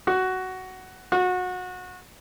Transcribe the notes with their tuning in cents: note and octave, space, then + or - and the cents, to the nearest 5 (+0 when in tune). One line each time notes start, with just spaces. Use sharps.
F#4 +10
F#4 -25